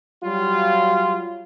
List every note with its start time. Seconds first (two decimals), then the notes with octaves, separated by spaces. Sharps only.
0.22 F#3 G3 F4